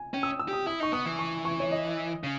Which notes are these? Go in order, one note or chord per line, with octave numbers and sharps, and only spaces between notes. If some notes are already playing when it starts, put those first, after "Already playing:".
Already playing: G#5
C#4 G5
E6
D#6
E6
G4 D#6
E4 D#6
D#4 C#6
B3 D#6
E3
C#6
C#6
C#5
D#5
C#3